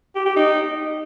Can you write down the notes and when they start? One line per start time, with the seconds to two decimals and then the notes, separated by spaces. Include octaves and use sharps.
0.15 G4
0.26 G4
0.36 D#4